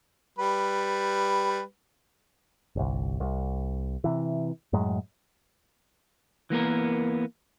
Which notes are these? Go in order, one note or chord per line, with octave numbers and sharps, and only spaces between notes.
G3 B4
G1 C2
C2
C3 E3
F#2 A2 F#3 G#3
E3 A#3 B3 A#4